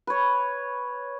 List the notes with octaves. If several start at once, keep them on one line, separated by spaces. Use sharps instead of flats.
B4 C#5